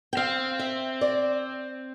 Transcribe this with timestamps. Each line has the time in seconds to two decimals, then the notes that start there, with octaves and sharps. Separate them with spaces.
0.13 G5
0.17 C4 F5
0.59 E5
1.01 D5